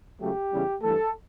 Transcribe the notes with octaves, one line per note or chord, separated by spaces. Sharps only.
C#2 C#3 F#3 A3 G4
E2 C#3 G3
G2 E3 A3 A4